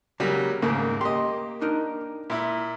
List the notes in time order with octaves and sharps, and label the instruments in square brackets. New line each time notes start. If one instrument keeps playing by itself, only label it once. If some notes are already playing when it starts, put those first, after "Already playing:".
[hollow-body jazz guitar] C#3 [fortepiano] F#3 G3 A#3
[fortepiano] D#2 [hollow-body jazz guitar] G#2 C#3 A3 [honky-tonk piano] A#3
[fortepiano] G4 D#5 [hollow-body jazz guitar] C6
[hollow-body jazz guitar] D4 D#4 A#4
[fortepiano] A#2 E4